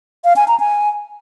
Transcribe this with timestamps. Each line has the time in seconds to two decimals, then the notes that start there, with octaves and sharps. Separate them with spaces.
0.24 F5
0.36 G#5
0.48 A#5
0.60 G#5